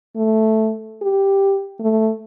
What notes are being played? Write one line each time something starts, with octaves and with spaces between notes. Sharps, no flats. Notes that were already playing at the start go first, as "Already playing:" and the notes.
A3
G4
A3